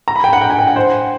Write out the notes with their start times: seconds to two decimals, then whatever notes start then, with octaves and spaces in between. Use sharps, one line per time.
0.08 A#5
0.16 B5
0.24 G5
0.33 F#5
0.41 G5
0.50 G#5
0.59 G5
0.67 F#5
0.76 C5